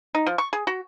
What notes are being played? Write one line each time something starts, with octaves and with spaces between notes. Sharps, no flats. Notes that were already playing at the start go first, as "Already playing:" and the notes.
D#4
F3
C#6
G#4
F#4